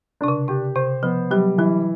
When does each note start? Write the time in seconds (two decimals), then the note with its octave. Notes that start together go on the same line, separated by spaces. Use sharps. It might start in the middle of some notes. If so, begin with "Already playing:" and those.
0.21 C3 D4
0.28 C#3
0.48 C3 G4
0.76 C3 C5
1.03 F3 B3
1.30 F#3 G3
1.58 E3 F#3